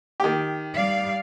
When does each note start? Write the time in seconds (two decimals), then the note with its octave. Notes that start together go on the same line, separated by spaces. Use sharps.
0.20 D#3 G4
0.75 G3 D5 F5